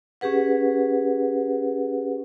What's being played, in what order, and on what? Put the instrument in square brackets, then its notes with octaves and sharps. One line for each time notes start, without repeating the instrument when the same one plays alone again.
[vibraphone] C#4 G4 G#4 B4 F#5